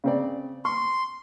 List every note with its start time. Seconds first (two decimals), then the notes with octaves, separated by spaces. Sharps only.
0.04 C#3 C4 D5
0.65 C6 C#6